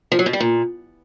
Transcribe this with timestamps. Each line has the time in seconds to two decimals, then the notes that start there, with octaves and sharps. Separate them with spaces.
0.12 F3
0.19 F#3
0.26 B2
0.33 G3
0.40 A#2